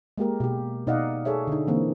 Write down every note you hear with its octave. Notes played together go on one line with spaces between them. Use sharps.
G#3 A#3 G4 A#4
B2 G4
B2 D#4 D5 D#5 F5 F#5
G#4 A4 C#5 E5
D3 D#4
D3 E3 A#3 C4